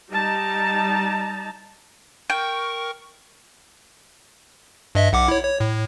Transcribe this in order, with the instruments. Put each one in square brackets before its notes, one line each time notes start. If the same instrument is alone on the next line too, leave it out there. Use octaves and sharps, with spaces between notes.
[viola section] G3 D#4 A5 A#5
[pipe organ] A#4 C#6 [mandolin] G5
[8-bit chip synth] G2 D#5 E5
B1 F#5 D6
E4 C#5
C#5
A2